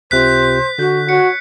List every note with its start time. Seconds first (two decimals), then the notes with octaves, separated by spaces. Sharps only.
0.11 C#2 C3 F4 C5 F#6 B6
0.78 D3 F#4 G6
1.09 F#4 C#5 C#7